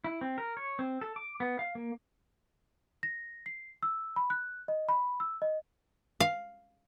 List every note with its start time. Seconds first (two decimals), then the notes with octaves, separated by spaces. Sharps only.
0.04 E4
0.21 C4
0.38 A#4
0.57 C#5
0.79 C4
1.01 A4
1.16 D6
1.40 B3
1.59 F5
1.75 A#3
3.03 A#6
3.46 C7
3.83 E6
4.16 B5
4.30 F#6
4.68 D#5
4.89 B5
5.20 E6
5.42 D#5
6.20 F5